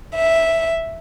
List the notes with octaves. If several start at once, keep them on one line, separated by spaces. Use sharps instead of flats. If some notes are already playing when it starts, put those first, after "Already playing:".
E5